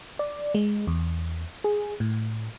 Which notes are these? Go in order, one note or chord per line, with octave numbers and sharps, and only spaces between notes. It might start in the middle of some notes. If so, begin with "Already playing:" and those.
D5
G#3
E2
G#4
A2